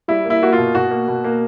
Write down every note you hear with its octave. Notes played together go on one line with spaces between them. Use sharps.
G3 E4
A#3
E4
A#3 F#4
F4
B2
B2 F#4
A#3
B2
A#3